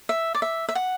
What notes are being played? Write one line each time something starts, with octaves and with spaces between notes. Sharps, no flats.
E5
D5
E5
E5
F#5